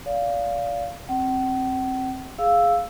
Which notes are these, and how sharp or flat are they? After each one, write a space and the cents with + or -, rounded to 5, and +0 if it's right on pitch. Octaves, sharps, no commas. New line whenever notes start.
D5 -30 F5 +0
C4 +15 F#5 +45
G#4 +0 F5 +0 E6 +0